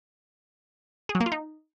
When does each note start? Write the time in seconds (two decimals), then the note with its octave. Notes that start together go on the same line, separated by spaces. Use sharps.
1.09 G#4
1.15 F#3
1.20 A#3
1.26 F4
1.32 D#4